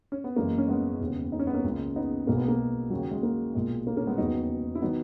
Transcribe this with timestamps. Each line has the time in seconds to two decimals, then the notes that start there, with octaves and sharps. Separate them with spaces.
0.12 C#4
0.24 B3
0.36 F#1 F#2 E3 G#3 A#3
0.58 C#4
0.68 G#3 B3
1.00 E1 D#2 C#3
1.32 D#4
1.39 C#4
1.47 B3
1.54 A#3 C#4
1.64 C#2 C#3 G#3
1.96 B3 D#4
2.27 B1 B2 G#3 A#3
2.37 B3
2.48 A#3
2.90 D#2 C#3 F#3
3.11 G#3
3.23 A#3
3.55 B1 A#2 G#3
3.87 A#3
3.97 A#3 C#4
4.07 G#3 B3
4.18 E1 D#2 C#3 F#3 B3 D#4
4.75 E4
4.82 D#3 F#3 B3 D#4